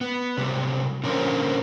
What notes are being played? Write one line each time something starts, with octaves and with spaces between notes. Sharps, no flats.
B3
C3 F#3 G3
A#2 D3 F3 C#4 A#4 C5